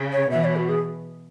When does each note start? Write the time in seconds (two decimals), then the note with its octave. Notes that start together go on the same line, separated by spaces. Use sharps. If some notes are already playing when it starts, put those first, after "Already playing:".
Already playing: C#3
0.12 C#5
0.31 B2 E3 E5
0.44 C#5
0.56 F#4
0.69 G#4